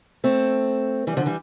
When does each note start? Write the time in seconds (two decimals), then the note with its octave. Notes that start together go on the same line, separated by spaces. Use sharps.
0.24 A3 C4
1.07 E3 G3
1.17 D3 F3
1.26 E3 G3